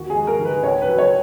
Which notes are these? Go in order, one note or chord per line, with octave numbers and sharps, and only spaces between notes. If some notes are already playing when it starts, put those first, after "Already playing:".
Already playing: D#2 F#4
G#4
G#3
A#4
D#3
B4
C#2 C#5
B4
F#3
C#5